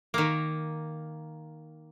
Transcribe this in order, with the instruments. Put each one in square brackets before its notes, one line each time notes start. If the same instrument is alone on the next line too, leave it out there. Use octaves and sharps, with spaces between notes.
[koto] D#3 A#3